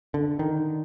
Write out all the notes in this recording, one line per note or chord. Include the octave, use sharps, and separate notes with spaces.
D3
D#3